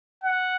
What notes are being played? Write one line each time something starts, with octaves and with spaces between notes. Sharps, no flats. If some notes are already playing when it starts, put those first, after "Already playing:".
F#5